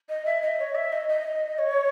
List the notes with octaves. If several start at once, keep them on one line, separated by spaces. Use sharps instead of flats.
D#5
E5
D#5
C#5
E5
D#5
D#5
C#5